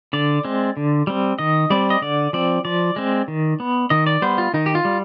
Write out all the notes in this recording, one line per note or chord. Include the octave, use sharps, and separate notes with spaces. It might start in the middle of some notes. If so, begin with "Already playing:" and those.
D3 D5
G#3 C4
D3
G3 C4
D#3 D#5
G3 C4 D5
D#5
D3 D5
F3 C4 D5
F3 D5
G#3 C4
D#3
B3
D#3 D#5
D5
G3 B3 C5
F4
D#3 D#4
G4
F4
G3